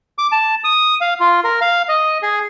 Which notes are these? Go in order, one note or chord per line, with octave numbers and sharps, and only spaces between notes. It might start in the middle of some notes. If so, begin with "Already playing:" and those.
D6
A5
D#6
F5
F4
A#4
F5
D#5
G#4